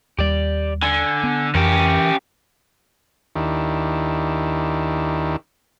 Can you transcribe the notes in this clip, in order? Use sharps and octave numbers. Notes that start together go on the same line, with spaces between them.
D#2 G3 G4 D5
D3 G#5
B3
F2 E3 C#4 G4 A#4
D#2 D#3 D4 E4 G4